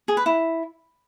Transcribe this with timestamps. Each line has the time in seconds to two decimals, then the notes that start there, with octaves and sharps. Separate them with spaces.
0.08 G#4
0.17 B4
0.26 E4